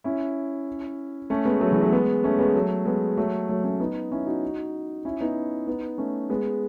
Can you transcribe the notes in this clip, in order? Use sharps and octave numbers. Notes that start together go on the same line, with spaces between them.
C#4 E4
A3 C#4
G#3 B3
F#3 A3
E3 G#3
F#3 A3
G#3 B3
A3 C#4
G#3 B3
F#3 A3
G#3 B3
F#3 A3
F#3 A3
A3 C#4
B3 D#4
C#4 E4
D#4 F#4
C#4 E4
B3 D#4
B3 D#4
A3 C#4
G#3 B3